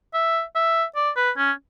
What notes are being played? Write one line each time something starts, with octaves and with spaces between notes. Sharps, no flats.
E5
E5
D5
B4
C#4